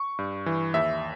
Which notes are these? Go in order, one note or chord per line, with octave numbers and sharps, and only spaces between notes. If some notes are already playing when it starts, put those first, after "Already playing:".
Already playing: C#6
G2
E3
D#2 E5